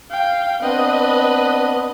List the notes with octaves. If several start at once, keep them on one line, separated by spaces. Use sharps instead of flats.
F5 G5
B3 C4 D4 B4 D#5